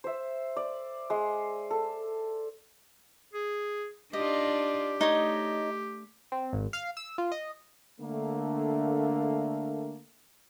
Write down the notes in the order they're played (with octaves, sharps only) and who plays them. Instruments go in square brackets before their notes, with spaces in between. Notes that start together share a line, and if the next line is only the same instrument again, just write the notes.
[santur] C5 E5
D5
G#3 C6
A4
[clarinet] G#4
[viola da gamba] D4 D#4 F4 [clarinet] G4 [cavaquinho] D#5
[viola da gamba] A3 [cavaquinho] D#4 C#5 D#5
[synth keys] C4
G#1
F5
E6
F4
D#5
[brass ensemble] D3 A3 A#3